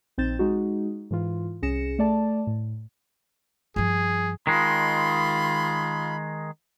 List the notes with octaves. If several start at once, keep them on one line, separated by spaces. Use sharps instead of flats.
A#1 C4 D#4 G6 A6 E7
G#3 D#4 F#4
G#2 E3 F4
C2 C#4 G#4 A#6 C#7 E7
A3 D5 A5
A2
G2 F3 G#4
D#3 G#3 F4 B5 C6